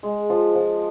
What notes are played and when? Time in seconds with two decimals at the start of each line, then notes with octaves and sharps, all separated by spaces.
0.03 G#3
0.30 F3
0.55 F3